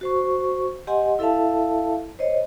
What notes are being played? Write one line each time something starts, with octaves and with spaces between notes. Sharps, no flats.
F#4 C5 C#6
G4 D#5 F#5 G#5 C6
E4 A4 E5 F5 A5
C5 C#5 D#5